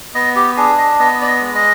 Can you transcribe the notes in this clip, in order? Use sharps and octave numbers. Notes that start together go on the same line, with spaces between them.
B3 D#5
G4
D4 G#4
D#5
B3 D#5
D5
D#5
G#3
D#5